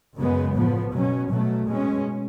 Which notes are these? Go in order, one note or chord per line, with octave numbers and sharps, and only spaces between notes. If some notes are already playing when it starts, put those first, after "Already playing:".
F#2 C#3 G#3 B3
A2 F3 B3
B2 F#3 C#4
B2 F#3 A3
B2 G#3 C#4